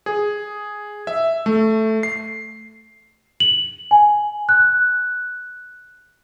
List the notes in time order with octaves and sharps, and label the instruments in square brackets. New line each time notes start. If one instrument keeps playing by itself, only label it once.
[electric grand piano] G#4
E5
A3
C7
[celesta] F#7
G#5
F#6